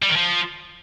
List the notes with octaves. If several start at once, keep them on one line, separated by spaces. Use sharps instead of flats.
G3
D#3
F3